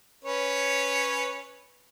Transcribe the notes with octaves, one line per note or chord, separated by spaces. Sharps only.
C#4 B4 C#5